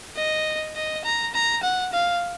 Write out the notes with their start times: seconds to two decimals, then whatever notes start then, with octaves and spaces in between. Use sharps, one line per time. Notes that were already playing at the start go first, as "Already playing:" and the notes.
0.16 D#5
0.76 D#5
1.04 A#5
1.34 A#5
1.63 F#5
1.93 F5